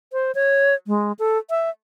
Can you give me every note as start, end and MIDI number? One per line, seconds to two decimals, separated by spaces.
0.13 0.32 72
0.35 0.75 73
0.87 1.12 56
1.19 1.38 69
1.50 1.70 76